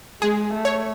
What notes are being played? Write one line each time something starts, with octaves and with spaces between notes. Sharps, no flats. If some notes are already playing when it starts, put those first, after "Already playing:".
G#3 G#4
A3
C#5